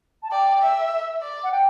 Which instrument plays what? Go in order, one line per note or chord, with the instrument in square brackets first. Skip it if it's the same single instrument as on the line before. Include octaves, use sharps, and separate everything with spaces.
[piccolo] A5
[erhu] D5 [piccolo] G5
[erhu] E5
D5
[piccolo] F#5
G5